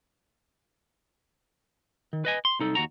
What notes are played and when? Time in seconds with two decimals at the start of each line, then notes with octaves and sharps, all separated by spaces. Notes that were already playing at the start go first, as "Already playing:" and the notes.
2.13 D#3
2.25 B4 D#5 G#5
2.45 C6
2.60 C2 D#4 A4
2.75 D#2 F#4 A#5